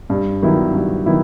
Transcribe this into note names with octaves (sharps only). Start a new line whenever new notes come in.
G2
D#3 F#3 B3 E4
G2
D#3 F#3 B3 E4